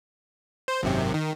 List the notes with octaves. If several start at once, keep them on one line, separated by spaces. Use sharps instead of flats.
C5
G#1 F#2 C3
D#3